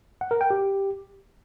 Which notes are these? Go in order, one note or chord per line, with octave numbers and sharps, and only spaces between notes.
F#5
A#4
G5
G4